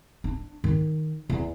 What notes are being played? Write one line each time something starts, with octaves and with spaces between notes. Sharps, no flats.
D4
D#3
E2